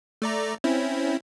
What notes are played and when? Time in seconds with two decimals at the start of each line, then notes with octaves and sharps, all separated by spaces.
0.22 A3 D5 A#5
0.64 C4 C#4 E4